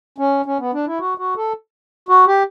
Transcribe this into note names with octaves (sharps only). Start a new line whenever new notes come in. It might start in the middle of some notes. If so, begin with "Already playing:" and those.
C#4
C#4
B3
D4
E4
F#4
F#4
A4
F#4
G4